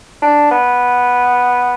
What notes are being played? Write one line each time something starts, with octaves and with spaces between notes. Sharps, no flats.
D4
B3